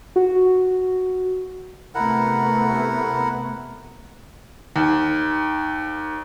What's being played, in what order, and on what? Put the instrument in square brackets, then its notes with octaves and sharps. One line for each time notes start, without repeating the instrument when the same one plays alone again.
[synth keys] F#4
[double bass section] C3 A3 B3 [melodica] E4 A#4 F#5
[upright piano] D#2